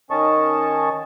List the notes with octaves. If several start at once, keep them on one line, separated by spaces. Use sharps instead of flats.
D#3 C#4 D#5 A5 C#6